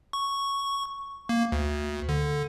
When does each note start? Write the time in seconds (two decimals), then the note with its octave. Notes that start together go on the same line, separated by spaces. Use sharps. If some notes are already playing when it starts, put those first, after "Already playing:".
0.13 C#6
1.29 A#3
1.52 D2
2.09 D3